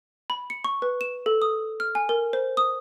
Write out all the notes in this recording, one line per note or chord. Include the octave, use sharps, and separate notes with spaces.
B5
C#7
C#6
B4
E7
A4
D#6
F6
G#5
A#4
C5
D#6